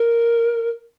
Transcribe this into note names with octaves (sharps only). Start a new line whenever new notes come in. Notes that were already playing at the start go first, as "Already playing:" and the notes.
Already playing: A#4